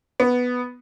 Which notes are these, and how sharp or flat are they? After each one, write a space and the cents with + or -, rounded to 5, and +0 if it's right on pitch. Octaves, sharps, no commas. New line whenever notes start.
B3 +0